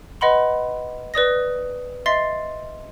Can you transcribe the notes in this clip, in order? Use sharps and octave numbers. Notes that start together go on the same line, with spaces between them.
B4 D#5 F#5 B5 C6
B4 D5 D#6 A#6
D#5 E5 C6 A6 C7